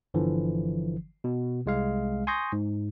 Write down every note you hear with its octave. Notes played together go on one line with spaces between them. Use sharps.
G1 D3 E3 F3
B2
C2 G#3 F5
G#5 C6 C#6 D#6 G6 A#6
G#2